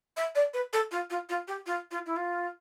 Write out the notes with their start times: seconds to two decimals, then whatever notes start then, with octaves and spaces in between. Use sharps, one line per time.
0.17 E5
0.36 D5
0.54 B4
0.73 A4
0.91 F4
1.10 F4
1.29 F4
1.48 G4
1.66 F4
1.91 F4
2.06 E4
2.16 F4